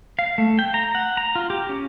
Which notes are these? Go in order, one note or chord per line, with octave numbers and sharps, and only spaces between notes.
F5
A3
G5
A#5
F#5
A#5
F4
G4
C#4